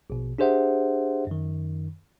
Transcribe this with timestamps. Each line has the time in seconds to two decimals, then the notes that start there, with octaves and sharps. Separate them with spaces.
0.10 A#1 B2
0.38 D4 G4 G#4 C5 E5 F#5
1.27 F#2 D#3